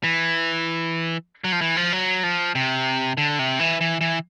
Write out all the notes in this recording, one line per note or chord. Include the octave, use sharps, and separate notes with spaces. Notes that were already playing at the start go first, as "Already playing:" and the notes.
E3
F#3
F3
E3
F3
F#3
F3
C3
D3
C3
E3
E3
E3